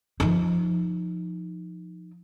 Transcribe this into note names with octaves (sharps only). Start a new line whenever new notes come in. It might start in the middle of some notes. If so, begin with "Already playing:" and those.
F3 D#4